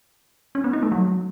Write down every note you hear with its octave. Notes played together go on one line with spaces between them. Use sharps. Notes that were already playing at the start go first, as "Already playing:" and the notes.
C#4
B3
D#4
A3
F#3